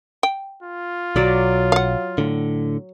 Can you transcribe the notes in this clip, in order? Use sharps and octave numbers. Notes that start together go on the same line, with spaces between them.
G5
F4
B1 F#3 D5
F5 F#5
A2 D3